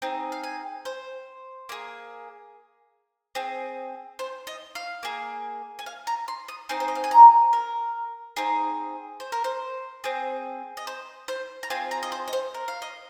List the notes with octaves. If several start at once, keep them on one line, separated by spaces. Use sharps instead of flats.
C4 D#4 G#4
F5
G#5
C5
A#3 G#4
C4 G#4
C5
D#5
F5
A#3 G#4
G#5
F5
A#5
C6
D#6
C4 D#4 G#4 C6
C5
D#5
F5
G#5
A#5
A#4
C4 D#4 G#4
C5
A#4
C5
C4 G#4
D#5
C5
C5
A#5
C4 F4 G#4 G#5
A#5
D#5
C5
D#5
C5
A#4
F5
D#5